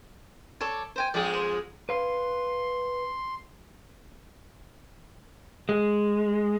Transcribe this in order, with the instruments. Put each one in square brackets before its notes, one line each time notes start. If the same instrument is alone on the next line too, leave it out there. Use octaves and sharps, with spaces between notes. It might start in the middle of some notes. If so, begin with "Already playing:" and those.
[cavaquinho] A4 C#5 D5
C5 G5 G#5
[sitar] F2 G#3 G#4 [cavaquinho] D5 E5 G5
[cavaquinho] C5
[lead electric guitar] B4 F5 [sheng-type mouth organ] C6
[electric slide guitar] G#3